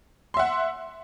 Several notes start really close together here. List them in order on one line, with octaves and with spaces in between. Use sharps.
C6 E5 F#5